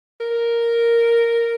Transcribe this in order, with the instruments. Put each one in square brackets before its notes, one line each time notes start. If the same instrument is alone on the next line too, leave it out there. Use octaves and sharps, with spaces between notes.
[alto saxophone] A#4